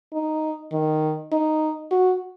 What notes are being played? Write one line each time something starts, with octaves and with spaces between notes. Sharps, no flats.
D#4
D#3
D#4
F#4